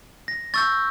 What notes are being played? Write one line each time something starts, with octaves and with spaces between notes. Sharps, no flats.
A#6
C#6 E6 G6 A6